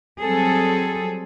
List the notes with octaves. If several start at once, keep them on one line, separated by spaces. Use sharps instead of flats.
F#3 G3 C4 G#4 A4